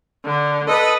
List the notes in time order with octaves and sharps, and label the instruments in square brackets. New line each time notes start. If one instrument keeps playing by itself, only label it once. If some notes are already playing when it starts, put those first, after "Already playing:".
[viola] D3
[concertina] A4 [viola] B4 D#5